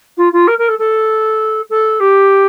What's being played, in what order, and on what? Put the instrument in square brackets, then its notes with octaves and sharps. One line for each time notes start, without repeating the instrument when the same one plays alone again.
[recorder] F4
F4
A#4
A#4
A4
A4
A4
G4